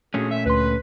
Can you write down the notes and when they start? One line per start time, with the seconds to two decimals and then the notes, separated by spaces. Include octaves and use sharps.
0.14 A#2 A3 C#4 D4 F#4 G#4
0.31 E5
0.46 D2 B4 C6